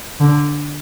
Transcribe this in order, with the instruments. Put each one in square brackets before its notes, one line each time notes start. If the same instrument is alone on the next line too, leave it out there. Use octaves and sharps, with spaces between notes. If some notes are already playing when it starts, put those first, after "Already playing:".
[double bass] D3